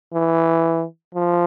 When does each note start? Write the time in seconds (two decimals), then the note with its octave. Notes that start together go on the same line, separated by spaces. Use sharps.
0.13 E3
1.15 F3